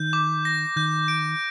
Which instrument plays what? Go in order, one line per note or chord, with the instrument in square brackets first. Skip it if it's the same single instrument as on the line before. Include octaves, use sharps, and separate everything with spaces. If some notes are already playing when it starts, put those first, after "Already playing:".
Already playing: [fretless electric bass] D#3 [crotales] G6
[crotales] D6
A#6
[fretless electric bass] D#3 [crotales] G6
[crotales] D7